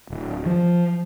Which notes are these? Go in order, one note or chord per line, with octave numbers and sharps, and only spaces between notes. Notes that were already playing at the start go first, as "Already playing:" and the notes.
D1
F3